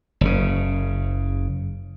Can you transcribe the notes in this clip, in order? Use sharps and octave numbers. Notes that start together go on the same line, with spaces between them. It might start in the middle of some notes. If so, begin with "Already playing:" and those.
F#1 C#3